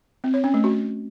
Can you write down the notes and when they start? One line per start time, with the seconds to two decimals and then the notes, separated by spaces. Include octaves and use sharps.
0.24 C4
0.34 C#5
0.44 C#4
0.54 A3
0.64 F#4